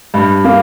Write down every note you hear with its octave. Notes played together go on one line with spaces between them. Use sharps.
G2
A#3